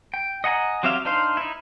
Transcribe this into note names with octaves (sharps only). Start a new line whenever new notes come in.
G5
D#5 F#5 G#5 A#5
F#3 C4 G4 E5 F5
D4 D#4 C5 F5 C6
D#4 E4